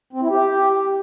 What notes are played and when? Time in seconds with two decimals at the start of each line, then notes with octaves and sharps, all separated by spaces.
0.13 C4
0.22 E4
0.30 G4